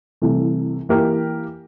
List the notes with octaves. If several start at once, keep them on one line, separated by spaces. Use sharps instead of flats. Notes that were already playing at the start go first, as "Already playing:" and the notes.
C2 C3 E3 A3
E3 A#3 E4 G4 A#4